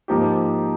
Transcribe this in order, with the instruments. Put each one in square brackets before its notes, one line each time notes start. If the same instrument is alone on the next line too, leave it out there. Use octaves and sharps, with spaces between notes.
[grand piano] G#2 F3 A#3 D#4 G4